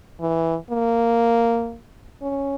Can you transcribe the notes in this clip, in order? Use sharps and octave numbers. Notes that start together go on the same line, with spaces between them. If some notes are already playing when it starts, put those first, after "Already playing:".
E3
A#3
C#4